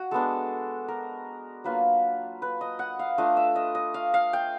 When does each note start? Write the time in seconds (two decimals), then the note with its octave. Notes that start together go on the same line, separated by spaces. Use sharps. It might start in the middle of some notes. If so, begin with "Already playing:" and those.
Already playing: F#4
0.11 G#3 B3 D4 A4
0.88 A#4
1.64 F#3 A#3 D4 F4 B4
2.42 B4
2.61 D#5
2.79 F#5
2.99 F5
3.18 A3 D4 F4 D#5
3.37 E5
3.56 D#5
3.75 D#5
3.94 F5
4.14 F5
4.33 G5